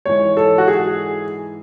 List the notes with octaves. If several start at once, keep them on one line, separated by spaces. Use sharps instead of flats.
G#2 E3 C#5
A4
F#4
G#4